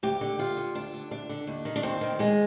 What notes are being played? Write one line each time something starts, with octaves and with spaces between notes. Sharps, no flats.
D2 G4
D3
D2 F4
D3
D2 D4
D3
D2 D4
D3
D#2
D#3
D4
D#2 C4
D#3
D#2 G#3